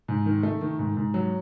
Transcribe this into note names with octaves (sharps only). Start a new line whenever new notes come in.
G#2
D#3
A3
D#3
G#2
G#2
F#3